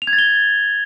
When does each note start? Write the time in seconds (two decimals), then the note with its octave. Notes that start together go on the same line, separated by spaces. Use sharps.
0.02 F7
0.07 G#6
0.13 A6
0.19 G7